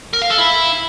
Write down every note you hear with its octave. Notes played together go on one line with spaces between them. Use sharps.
A#4
F5
A4
E4